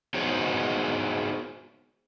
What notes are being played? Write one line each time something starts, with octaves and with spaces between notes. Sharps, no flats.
B3 D#4 F#4 G#4 C5 C#5